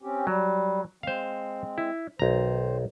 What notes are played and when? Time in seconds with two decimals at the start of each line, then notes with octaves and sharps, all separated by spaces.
0.02 C4 C#4 G4
0.27 F#3 G3
1.03 G#3 C4 C5 F5
1.78 E4
2.19 B1 D#3 C5 A#5